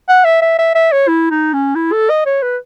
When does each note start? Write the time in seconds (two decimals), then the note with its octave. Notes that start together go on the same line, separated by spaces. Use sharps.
0.09 F#5
0.25 E5
0.42 E5
0.59 E5
0.75 E5
0.92 C#5
1.08 E4
1.31 D#4
1.53 C#4
1.75 E4
1.92 A4
2.10 D#5
2.26 C#5
2.42 B4